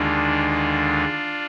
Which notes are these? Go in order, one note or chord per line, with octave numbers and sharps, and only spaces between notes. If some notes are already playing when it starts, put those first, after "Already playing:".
Already playing: D#2 D3 G#3 D4 F4